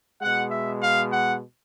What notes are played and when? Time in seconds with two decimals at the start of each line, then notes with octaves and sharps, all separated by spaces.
0.21 B2 G#3 F#5
0.51 E5
0.82 F5
1.12 F#5